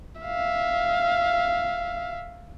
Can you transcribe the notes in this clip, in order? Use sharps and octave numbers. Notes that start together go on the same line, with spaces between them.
E5 F5